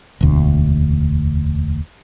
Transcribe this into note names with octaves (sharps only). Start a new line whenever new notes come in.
E1 D2